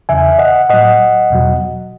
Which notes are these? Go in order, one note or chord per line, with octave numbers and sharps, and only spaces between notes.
E2 C#3 E3 E5 G#5
D#5 F#5
A2 F#3 D#5 F#5
E2 B2 F#3